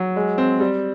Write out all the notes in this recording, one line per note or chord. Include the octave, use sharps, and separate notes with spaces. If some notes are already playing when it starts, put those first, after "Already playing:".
Already playing: F#3
G#3
C4
G3